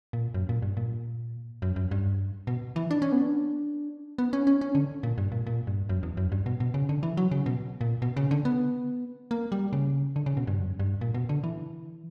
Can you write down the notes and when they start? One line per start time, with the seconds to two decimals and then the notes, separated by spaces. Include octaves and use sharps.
0.13 A#2
0.34 F#2
0.49 A#2
0.62 G2
0.77 A#2
1.62 F#2
1.76 F#2
1.91 G2
2.47 B2
2.76 E3
2.91 D4
3.02 C#4
3.12 B3
3.22 D4
4.18 B3
4.33 C#4
4.47 C#4
4.61 C#4
4.75 D3
5.03 A#2
5.18 G2
5.32 A#2
5.47 A#2
5.67 G2
5.89 F#2
6.03 E2
6.17 F#2
6.32 G2
6.46 B2
6.60 B2
6.74 C#3
6.89 D3
7.03 E3
7.17 F#3
7.31 C#3
7.46 B2
7.81 A#2
8.02 B2
8.17 C#3
8.31 D3
8.45 B3
9.31 A#3
9.52 G3
9.73 C#3
10.16 D3
10.26 C#3
10.37 B2
10.47 G2
10.58 F#2
10.80 G2
11.01 A#2
11.14 B2
11.29 D3
11.44 E3